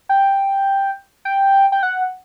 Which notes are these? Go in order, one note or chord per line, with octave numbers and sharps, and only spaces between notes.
G5
G5
G5
F#5